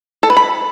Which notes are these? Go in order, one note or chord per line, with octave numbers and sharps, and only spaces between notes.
A4
B4
B5